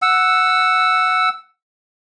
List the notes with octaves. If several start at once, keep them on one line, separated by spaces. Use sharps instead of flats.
F#5 E6